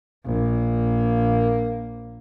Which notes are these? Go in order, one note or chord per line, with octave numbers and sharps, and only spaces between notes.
A#1 A#3